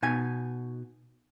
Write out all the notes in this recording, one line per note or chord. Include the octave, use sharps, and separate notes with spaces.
B2 D#4 G#5